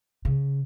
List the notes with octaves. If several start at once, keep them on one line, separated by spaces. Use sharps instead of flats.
C#3